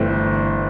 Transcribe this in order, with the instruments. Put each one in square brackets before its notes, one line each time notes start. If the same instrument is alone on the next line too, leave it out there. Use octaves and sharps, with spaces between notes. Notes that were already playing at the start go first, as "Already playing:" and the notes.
Already playing: [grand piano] G1 G2 E3 A3 C4